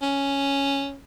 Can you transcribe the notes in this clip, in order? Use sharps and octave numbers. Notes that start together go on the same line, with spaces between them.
C#4